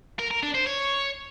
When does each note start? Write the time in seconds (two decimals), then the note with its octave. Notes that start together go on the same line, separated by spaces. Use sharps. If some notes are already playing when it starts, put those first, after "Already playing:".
0.19 A#4
0.31 A#4
0.43 D4
0.55 C5
0.66 C#5